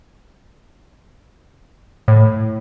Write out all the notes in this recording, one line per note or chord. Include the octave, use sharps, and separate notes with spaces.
A2